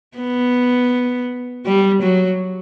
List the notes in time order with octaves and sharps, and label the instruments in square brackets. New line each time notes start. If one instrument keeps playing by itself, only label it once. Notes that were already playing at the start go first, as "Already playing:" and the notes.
[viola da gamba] B3
G3
F#3